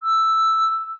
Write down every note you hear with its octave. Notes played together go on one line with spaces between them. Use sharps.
E6